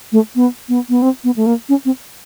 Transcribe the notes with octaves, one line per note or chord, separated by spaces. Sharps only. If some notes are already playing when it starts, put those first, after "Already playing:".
A3
B3
B3
B3
C4
B3
A3
A#3
C#4
C4